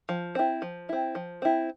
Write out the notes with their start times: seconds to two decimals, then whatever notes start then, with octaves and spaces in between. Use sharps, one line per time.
0.09 F3
0.35 C4 E4
0.62 F3
0.89 C4 E4
1.15 F3
1.42 C4 E4